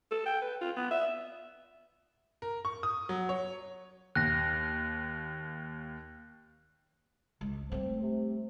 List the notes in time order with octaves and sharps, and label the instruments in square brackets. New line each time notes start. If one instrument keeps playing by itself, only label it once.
[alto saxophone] A4
G5
B4
F4
B3
E5
[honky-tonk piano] A#4
C#6
D#6
F#3
C#5
[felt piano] D#2 [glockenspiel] F#6 A#6
[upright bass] C#2 G#3
[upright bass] G3 A3 [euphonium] C4
[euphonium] C3